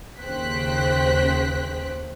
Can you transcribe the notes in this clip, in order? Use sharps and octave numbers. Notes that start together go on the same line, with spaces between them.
D#2 C#3 C5 G5 F#6 B6